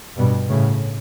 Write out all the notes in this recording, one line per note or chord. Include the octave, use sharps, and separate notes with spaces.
G2 B2
A2 C#3